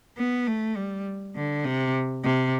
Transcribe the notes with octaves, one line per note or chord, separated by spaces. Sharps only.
B3
A3
G3
D3
C3
C3